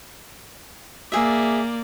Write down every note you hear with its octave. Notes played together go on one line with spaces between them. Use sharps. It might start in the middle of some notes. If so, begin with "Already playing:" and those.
A#3 G#4 D5 E5